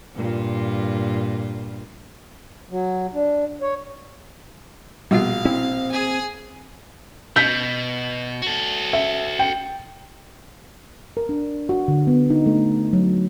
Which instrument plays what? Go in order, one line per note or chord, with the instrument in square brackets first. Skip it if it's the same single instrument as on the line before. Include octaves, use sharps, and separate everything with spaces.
[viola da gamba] G2 A#2 F4
[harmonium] F#3
D4
C#5
[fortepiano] A#1 B2 [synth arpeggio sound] G3 F4 [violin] F5
[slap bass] C4 [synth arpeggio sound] E4
[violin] G#4 G#5
[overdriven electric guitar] B2 [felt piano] G6 B6
[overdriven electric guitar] F#4 A4
[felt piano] E5
G5
[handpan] A#4
D4
F#4
D3
B3
D#4
A3
F#3